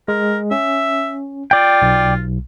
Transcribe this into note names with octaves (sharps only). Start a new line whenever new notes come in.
G#3 A#4
C#4 E5
F4 D5 G5
B1